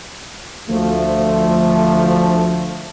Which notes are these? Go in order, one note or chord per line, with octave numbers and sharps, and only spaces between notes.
D2 F3 A3